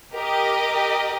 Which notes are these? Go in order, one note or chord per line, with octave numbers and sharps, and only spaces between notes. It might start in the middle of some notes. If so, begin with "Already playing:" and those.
G4 A#4 D#5